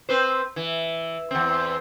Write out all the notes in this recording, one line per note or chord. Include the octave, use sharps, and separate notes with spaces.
C4 B4 C5
E3
E2 C4